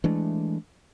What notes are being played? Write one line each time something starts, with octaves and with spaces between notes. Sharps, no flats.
E3 G#3 A3 D4